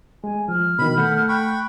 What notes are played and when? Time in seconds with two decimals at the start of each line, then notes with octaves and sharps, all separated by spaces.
0.24 G#3 G#5
0.48 F3 F6
0.79 B2 D#3 B5
0.97 A3 A4 F#5 G6
1.29 G5 B5 C#6 F#6